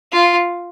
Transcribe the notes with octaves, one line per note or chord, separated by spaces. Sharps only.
F4